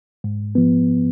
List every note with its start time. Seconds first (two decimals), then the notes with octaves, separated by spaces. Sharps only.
0.24 G#2
0.55 F3 B3